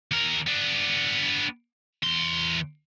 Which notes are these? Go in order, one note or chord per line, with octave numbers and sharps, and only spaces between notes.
D#2 A#4
B3 D4
E2 C6